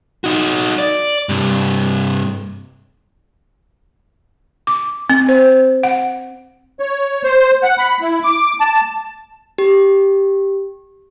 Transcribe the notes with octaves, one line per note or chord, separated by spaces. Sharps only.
D#4 F#4
D5
G2 C3
D6
C4
C5
F#5
C#5
C5
F#5
B5
E4
D6
A5
G4